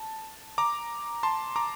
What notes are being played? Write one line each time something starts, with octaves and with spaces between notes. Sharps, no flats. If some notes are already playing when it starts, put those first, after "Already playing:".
Already playing: A5
A#5 D6
A5 C6
A#5 D6